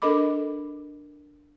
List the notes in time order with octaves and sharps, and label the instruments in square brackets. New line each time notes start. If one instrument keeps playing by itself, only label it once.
[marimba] D4 A4 A#4 D#5 B5 D6